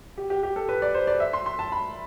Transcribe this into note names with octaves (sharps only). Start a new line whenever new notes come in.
G4
G4
G4
A4
B4
D5
C5
D5
E5
C6
C6
A5
B5